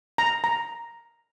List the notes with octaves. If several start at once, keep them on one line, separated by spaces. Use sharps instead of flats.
A#5
A#5